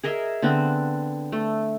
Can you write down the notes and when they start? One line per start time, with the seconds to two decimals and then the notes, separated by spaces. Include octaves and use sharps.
0.03 G#4 A#4 D#5 E5
0.42 D3 B3 C4
1.32 A3